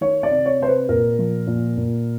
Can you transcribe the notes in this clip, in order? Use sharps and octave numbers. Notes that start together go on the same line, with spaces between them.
D#3 C#5
D5
C3
C#5
C3 C5
B4
A#2 A#4
F3
A#2
A#2